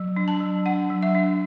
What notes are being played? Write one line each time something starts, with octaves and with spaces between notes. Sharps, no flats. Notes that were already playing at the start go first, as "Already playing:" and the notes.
Already playing: F#3
D4
A5
F#3
D4 F#5
F#3
E5
D4